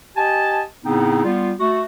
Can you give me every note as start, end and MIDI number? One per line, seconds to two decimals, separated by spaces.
0.17 0.61 67
0.17 0.61 75
0.17 0.61 80
0.17 0.61 81
0.84 1.20 45
0.84 1.20 49
0.84 1.20 59
0.84 1.20 60
0.84 1.20 63
1.24 1.51 55
1.24 1.51 59
1.24 1.51 65
1.59 1.82 57
1.59 1.82 66